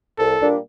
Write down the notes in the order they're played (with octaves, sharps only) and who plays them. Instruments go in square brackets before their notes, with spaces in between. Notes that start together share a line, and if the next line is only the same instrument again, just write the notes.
[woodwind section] C2 [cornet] A4
[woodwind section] A#2 G3 A#3 D4